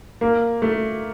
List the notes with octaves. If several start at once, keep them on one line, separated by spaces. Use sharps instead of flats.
A#3
A3